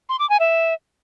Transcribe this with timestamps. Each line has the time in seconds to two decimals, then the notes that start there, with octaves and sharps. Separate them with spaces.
0.09 C6
0.19 D6
0.29 G#5
0.40 E5